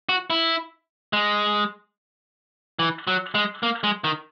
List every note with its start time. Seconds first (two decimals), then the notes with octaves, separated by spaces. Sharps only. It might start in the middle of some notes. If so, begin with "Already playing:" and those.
0.09 F#4
0.30 E4
1.13 G#3
2.79 E3
3.07 F#3
3.35 G#3
3.63 A#3
3.84 G#3
4.04 D#3